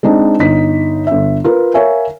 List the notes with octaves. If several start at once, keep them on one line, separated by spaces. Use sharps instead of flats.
G#3 C4 D4 D#4
G1 D#4 B6
G1 E5
F4 A#4 B4
A#4 C#5 E5 F5 G#5